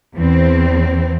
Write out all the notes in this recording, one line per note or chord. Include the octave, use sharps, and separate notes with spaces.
E2 C4